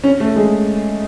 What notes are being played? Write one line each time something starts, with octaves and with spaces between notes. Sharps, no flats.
C#4
A3
G#3